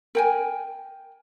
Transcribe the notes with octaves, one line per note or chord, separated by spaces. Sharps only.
A#4 G5 G#5